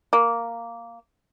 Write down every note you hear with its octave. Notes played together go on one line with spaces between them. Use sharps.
A#3